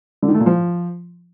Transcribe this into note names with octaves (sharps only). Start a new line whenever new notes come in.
D3
D#3
A3
A#2
F3